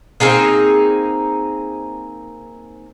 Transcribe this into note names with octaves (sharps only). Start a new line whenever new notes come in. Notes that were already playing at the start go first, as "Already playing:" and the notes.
A#3 C4 D#4 G#4